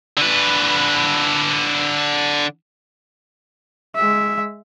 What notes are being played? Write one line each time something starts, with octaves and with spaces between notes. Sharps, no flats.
D3 B4
G#3 E5